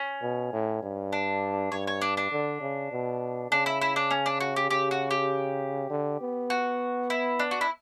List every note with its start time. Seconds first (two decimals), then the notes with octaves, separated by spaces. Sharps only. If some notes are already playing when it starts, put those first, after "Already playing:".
Already playing: C#4
0.22 B2
0.52 A2
0.83 G2
1.13 D4
1.72 G2 C#5
1.87 C#5
2.01 D4
2.17 D4
2.31 D3
2.61 C#3
2.91 B2
3.51 C#3 D4
3.66 E4
3.81 E4
3.96 D4
4.11 C#4
4.26 D4
4.40 F#4
4.56 G4
4.70 C#3 G4
4.91 F#4
5.11 G4
5.90 D3
6.21 B3
6.50 F#4
7.10 E4
7.39 D4
7.51 F#4
7.61 E4